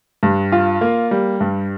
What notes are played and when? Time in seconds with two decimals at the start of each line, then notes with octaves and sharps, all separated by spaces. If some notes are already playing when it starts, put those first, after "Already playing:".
0.23 G2
0.52 F4
0.81 A#3
1.11 G3
1.41 G2